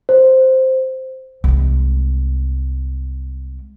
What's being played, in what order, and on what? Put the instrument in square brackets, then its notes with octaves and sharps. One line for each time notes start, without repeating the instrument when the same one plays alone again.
[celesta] C5
[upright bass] C2 G#3